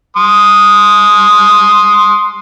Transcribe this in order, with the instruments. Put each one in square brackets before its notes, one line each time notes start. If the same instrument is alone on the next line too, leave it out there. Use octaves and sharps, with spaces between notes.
[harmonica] C6 D#6